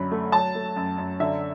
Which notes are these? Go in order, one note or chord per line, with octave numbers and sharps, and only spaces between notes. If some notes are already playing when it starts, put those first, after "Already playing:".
Already playing: F#2 D3 F#3 B5
A3
F#3 A5
A3
F#2
F#2
D3 E5